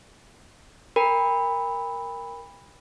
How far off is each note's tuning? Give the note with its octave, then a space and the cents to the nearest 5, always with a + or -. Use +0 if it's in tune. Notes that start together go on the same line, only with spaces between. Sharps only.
A#4 +0 G5 +40 B5 +0